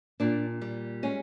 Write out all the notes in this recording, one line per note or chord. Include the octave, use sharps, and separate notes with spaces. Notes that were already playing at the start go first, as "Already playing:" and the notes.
A#2 D4
G3
G#3 C#4